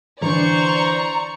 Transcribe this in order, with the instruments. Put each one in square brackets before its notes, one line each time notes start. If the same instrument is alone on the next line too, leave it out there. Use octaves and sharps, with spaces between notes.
[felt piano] D3 E3 [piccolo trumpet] C5 [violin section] D5 C#6 [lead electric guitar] A#5